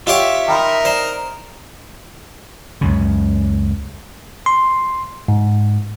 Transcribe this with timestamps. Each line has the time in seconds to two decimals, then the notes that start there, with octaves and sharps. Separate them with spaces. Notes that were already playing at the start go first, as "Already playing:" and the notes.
0.07 F4 G4 C#5 D#5 E5 F#5 G5
0.48 D#4 A#4 G5 B5 C6
0.85 C5 D5 A#5
2.81 C#2 F#2 C#3
4.46 C6
5.28 G#2